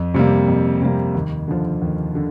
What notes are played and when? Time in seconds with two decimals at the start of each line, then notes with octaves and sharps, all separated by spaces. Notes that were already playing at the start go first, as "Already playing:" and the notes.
Already playing: F2
0.14 C3 G3 A#3
0.48 F2
0.82 C3 G3 A#3
1.15 D#2
1.48 D3 F3
1.82 D#2
2.15 D3